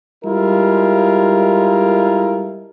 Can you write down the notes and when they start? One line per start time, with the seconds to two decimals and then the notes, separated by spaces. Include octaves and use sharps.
0.24 G3 G#3 E4 F4 A4 A#4